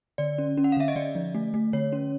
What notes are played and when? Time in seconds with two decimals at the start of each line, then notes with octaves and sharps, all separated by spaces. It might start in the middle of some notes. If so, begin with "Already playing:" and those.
0.18 D3 D5
0.38 C#4
0.57 C#4
0.64 F#5
0.72 F5
0.77 D3 E5
0.88 D#5
0.96 D3 D5
1.15 F3
1.35 A3
1.54 A3
1.73 D3 C#5
1.92 C#4